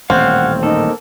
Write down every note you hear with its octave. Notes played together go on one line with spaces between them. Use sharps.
D#1 A1 C4 C#5 F5 F#5
A#3 D#4 A4